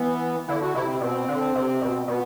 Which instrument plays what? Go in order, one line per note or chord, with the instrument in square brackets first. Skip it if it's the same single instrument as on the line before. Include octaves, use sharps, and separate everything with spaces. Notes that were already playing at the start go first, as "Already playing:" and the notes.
Already playing: [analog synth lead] E3 [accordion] B3
[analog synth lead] D3 [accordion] E4
[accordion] F#4
[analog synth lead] C3 [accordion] E4
[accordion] C4
[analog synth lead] B2 [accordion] C4
[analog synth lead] D3
C3
B2
[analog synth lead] B2 [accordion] B3